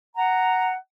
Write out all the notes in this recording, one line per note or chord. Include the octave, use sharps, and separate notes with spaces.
F#5 A#5